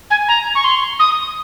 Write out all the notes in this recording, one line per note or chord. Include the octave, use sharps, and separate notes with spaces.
G#5
A#5
C#6
C6
D#6